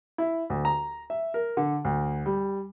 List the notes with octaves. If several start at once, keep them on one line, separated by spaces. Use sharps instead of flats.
E4
D2
A#5
E5
A#4
D3
D2
G3